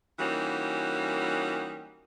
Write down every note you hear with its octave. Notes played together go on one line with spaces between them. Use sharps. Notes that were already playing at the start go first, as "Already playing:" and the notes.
E3 G3 A#3 C#4 D#4 F#4